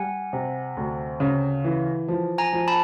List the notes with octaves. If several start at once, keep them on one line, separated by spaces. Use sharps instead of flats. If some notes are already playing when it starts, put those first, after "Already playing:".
Already playing: G3 F#5 G#5
C3
D2
C#3
E3
F3
G#5 A#5
F3
A5 B5